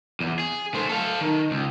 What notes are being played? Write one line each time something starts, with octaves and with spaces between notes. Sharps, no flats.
E2
G#4
A3 C5
A4 F5
D#3
C#2